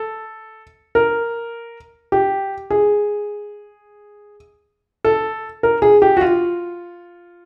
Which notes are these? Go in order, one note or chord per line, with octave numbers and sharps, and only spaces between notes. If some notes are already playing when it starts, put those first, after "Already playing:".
Already playing: A4
A#4
G4
G#4
A4
A#4
G#4
G4
F#4
F4